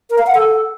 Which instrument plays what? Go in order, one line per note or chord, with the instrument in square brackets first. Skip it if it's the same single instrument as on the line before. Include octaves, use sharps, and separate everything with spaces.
[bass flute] A#4
F5
F#5
A4